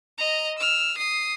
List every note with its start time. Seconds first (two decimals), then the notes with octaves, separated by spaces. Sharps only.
0.18 D#5 A#5
0.58 E6 F6
0.97 D#6 C7